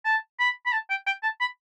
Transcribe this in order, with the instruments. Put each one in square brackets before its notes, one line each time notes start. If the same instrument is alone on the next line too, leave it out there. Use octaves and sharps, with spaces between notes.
[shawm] A5
B5
B5
A5
G5
G5
A5
B5